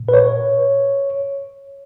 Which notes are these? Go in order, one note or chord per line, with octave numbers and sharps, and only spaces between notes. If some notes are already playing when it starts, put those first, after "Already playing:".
Already playing: A#2
B4
C#5